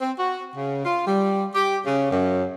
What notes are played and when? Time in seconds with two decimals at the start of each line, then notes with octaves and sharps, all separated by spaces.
0.01 C4
0.18 F#4
0.56 C#3
0.85 F4
1.07 G3
1.55 G4
1.86 C#3
2.11 F#2